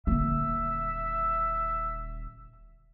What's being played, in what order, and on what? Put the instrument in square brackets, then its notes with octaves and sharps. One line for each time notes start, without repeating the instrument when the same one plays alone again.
[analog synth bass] D#1 [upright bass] D3 A#3 [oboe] E5